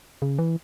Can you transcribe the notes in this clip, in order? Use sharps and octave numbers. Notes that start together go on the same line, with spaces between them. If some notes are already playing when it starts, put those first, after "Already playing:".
C#3
E3